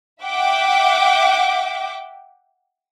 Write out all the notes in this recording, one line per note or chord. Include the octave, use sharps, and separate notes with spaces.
E5 F#5 G5 D6